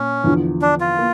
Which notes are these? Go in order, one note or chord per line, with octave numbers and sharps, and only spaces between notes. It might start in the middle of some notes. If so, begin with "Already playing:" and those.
Already playing: A#2 C#4
E2 D3 F3
D4
F4
A#3